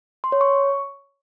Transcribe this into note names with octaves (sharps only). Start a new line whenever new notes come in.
C6
C#5
C#6